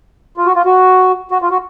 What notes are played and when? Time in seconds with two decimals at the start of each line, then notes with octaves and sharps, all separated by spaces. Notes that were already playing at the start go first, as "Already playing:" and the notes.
0.37 F4
0.46 F#4
0.56 F4
0.66 F#4
1.31 F#4
1.42 F4
1.51 F#4